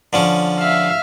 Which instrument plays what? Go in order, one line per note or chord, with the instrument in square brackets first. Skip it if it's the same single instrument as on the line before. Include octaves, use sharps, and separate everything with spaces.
[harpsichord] D3 F3 C#4
[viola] E5 F5